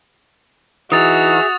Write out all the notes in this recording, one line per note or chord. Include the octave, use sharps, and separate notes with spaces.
E3 D#4 F#4 G#4 E5 D#6 A6 F7